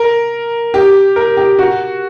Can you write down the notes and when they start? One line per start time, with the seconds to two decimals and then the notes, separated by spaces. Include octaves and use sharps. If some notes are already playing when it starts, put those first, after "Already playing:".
Already playing: A#4
0.74 G4
1.16 A#4
1.37 G4
1.59 F#4